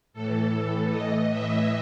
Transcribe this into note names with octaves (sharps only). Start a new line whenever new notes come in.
A2 E3 A4
A2 E3 D#5
E5